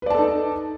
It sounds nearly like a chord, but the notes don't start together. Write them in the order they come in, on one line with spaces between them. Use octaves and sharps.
B4 D5 A5 A4 D#4